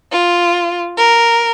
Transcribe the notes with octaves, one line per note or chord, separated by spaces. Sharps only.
F4
A#4